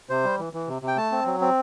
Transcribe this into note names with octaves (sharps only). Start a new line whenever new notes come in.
C3 C5
G3
E3
E3
C3
C3
G5
A3 A5
C4
F#3
C4